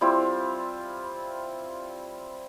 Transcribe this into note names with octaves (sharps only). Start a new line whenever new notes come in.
G3 C4 E4 F4